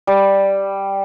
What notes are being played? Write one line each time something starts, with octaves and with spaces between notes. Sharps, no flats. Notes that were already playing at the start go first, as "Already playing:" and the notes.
G3